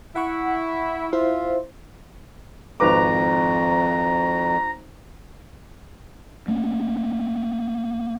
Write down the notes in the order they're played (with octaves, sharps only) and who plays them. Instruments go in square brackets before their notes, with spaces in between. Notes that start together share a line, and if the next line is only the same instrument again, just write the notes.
[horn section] E4 [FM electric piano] F#5 C#6
[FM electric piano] E4 C5 [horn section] F4 E5
[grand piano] G#1 B4 D6 [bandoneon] F2 [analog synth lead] A#5
[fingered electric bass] A3 A#3 C#4